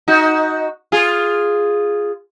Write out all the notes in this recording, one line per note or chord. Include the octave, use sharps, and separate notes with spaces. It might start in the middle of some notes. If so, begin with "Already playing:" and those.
D#4 F#4
F4 G#4